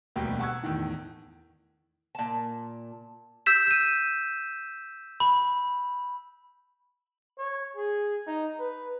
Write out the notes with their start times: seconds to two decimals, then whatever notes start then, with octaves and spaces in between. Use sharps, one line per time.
0.16 E1 D2 B2 G3 A#3 G5
0.39 F#5 A5 C#6 E6 F#6 G#6
0.63 E2 A2 D#3
2.15 A#2 A5
3.46 E6 G6 B6 E7
3.67 G6 D#7
5.20 B5
7.38 C#5
7.76 G#4
8.27 D#4
8.59 B4